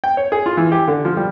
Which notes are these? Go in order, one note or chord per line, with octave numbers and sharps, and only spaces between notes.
G5
C#5
G#4
F4
E3
G4
D3
F3
G3